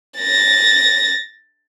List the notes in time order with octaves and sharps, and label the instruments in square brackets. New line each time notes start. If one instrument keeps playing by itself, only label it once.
[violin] A6 A#6